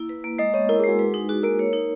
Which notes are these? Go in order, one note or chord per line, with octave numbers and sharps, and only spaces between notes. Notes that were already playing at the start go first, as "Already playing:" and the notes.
Already playing: A#3 E4
B4
A#3
G#3 D#5
B3 C#5
E4 A#4
G#4
G#3 F#4
B4
D#4
F#4 G#4
A#3 A#4
C#5
D#4